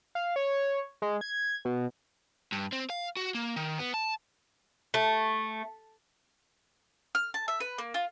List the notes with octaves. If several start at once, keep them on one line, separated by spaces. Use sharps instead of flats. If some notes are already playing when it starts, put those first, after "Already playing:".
F5
C#5
G#3
G#6
B2
G2
C4
F5
F#4
A#3
D#3
B3
A5
A3
F6
A5
E5
B4
A#3
F4